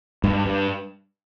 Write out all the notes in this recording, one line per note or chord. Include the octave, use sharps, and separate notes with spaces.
G2
G2